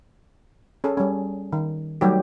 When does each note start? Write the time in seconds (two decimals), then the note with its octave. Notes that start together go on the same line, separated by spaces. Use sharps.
0.84 C#4 G#4 A4
0.97 G3 C#4
1.53 D#3
2.01 F#3 G3 A3 D#4 F#4 G4